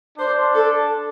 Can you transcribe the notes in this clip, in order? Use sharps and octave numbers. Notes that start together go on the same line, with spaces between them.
D4 C5
A4